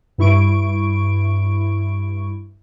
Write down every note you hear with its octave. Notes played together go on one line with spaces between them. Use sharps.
G2 E4 C#6 D7